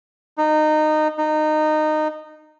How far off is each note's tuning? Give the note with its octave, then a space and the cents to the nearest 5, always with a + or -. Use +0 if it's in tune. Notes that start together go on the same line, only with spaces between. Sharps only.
D#4 -20
D#4 -20